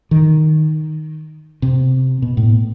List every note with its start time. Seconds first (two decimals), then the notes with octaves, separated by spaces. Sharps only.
0.11 D#3
1.62 C3
2.22 B2
2.37 A2